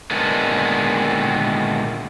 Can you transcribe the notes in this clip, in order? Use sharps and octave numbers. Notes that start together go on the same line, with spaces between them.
A#2 D3 D#3 G#3 A3 B3